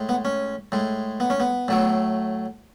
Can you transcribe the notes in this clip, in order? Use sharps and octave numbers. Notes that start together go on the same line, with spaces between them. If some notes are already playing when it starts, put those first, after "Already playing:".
Already playing: A2 G#3
B3
C#4
A2 G#3
B3
C#4
B3
A2 F#3 A3